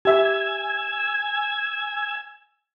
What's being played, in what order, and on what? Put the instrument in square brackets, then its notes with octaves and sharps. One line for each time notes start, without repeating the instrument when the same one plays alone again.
[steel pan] G4 E5 [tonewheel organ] G#5 E6 G#6